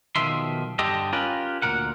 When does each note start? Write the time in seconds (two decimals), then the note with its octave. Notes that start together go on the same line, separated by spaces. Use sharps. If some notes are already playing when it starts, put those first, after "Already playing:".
0.16 B1 F2 D#3 F3 E5 C6
0.79 G2 D3 G4 A4 C5 D#5
1.13 C#4 F4 G4 A#4 B4
1.62 D2 A#2 D#3 G#3 A#4 F#5